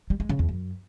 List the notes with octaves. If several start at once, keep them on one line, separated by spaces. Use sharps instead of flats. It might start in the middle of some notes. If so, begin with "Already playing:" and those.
G3
G#3
C#3
E2
F#2